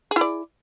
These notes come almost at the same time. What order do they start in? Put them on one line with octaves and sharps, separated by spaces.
G#4 E4 D5